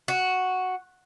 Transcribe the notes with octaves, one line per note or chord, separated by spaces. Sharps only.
F#4